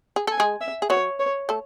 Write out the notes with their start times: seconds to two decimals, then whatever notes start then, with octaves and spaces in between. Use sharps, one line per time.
0.16 G#4
0.27 A4 G#5
0.40 G#3 G#4
0.61 E5
0.82 G#4
0.90 F#3 F#4 C#5
1.19 C#5
1.49 A3 A4